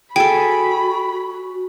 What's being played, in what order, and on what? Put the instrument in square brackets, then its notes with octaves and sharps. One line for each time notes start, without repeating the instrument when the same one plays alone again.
[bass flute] F#4 [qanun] G#4 A4 [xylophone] G5 [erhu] B5